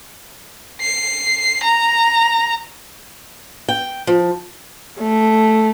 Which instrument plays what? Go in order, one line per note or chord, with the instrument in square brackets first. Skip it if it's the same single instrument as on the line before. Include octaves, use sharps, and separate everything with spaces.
[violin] C7
A#5
[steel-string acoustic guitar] G5
F3
[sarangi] A3